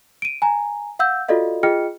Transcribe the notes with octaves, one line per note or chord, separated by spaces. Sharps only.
D7 D#7
G#5 A#5
F5 F#5 E6 G6
F4 F#4 A4 D5 D#5 F5
F4 G#4 D#5 G5 F6 C#7